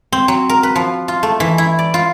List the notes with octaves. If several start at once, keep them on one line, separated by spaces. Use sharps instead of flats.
C4
F#3
A#4
B4
F3
F4
A3
E3
E4
D5
F4